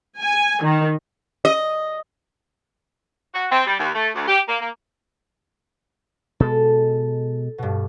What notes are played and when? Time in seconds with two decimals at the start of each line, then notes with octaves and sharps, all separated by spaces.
0.20 G#5
0.64 D#3
1.45 D#5
3.34 F#4
3.50 C4
3.66 G3
3.79 D#2
3.95 A3
4.15 D2
4.28 G4
4.48 A#3
4.61 A#3
6.40 B2 G#3 A4
7.58 G2 B2